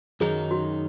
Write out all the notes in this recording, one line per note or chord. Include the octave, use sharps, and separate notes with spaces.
F#2 D#3 F#3 D#4 G#4
F#4